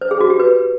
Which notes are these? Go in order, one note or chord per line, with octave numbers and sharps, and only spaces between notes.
C5
G#4
F#4
G4
B4